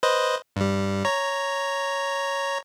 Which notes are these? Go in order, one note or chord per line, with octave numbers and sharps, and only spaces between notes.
B4 C5 D#5
G2 G3
C#5 A#5